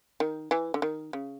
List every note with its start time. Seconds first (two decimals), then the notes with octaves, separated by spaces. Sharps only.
0.20 D#3
0.51 E3
0.74 D3
0.82 D#3
1.13 C#3